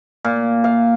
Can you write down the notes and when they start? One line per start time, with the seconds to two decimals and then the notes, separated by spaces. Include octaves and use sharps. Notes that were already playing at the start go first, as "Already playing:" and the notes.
0.25 A#2
0.64 F5